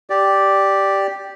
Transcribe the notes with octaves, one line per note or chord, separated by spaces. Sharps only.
G4 D5